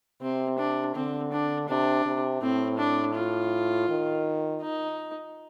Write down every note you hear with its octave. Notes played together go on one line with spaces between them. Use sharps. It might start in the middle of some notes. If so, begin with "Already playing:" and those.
C3 C4
D4
D3 C4
D4
C3 D4
C3
A2 C4
D4
F4
D#3
D#4